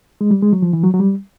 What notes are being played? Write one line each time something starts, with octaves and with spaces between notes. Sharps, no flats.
G#3
G3
G#3
F#3
F3
E3
F#3
F#3
G3